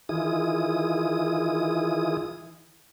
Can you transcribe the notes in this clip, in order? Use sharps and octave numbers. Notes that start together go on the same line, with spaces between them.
D#3 E3 E4 F4 G#4 D#6